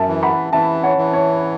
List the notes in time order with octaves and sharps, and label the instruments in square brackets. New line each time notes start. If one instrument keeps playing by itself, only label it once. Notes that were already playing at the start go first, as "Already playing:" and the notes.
Already playing: [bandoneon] F#2 [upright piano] E5 A5
[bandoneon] E3
[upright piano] F#5 B5
[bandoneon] E3 [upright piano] E5 A5
[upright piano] C#5 F#5
[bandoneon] E3
[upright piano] C#5